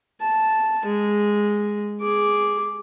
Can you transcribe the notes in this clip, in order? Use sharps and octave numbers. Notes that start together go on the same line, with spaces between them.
A5
G#3
G#4 D6